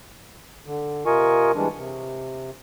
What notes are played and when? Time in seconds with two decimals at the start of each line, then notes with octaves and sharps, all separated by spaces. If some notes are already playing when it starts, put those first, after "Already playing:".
0.66 D3
1.06 C3 F4 A#4 D#5 G#5 C#6
1.55 E3 G3 G#3 D4
1.77 C3